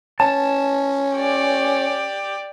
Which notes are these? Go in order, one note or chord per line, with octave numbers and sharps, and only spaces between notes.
C#4 A5
G4 D5